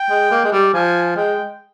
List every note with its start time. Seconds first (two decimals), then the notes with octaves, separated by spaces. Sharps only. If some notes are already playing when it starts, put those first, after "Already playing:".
Already playing: G5
0.10 G#3
0.31 A#3
0.44 G#3
0.52 G3
0.73 F3 G#5
1.16 G#3 G5